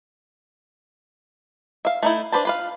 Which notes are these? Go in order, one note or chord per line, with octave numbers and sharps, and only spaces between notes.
E5 F5
A3 D#4 E4
D4 B4 C5 A5
F4 B4 F5